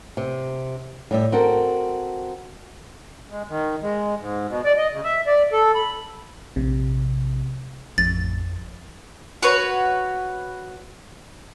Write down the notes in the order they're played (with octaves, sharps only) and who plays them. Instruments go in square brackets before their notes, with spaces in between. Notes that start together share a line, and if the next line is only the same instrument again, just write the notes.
[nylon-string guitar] C3
A2 G3 E5
C4 F#4 A4 A#4
[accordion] G#3
D#3
G#3
G#2
B2
D5
D#5
C#3
E5
D5
A4
B5
[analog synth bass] A#1 [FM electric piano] C3
[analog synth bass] A1 [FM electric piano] F2 [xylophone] A6
[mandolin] F#4 B4 C#5